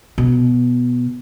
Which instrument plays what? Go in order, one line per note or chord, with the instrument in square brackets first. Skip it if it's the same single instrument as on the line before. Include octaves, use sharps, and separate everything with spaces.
[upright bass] B2